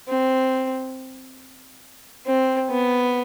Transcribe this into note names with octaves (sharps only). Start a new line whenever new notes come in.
C4
C4
B3